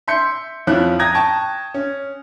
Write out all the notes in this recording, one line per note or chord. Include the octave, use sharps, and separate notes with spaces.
E5 C6 G6 C#7
F2 F3 C#4 E4 F#6
G5 A#5 D#6 G#6 A#6
G5 A5 C#6
C#4